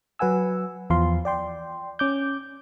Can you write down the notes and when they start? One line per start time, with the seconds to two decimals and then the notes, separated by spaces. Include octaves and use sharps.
0.19 F#3 B4 F#5 G#5 E6
0.90 E2 F3 F5 C6
1.25 D5 G5 C6
1.99 C#4 D6 G6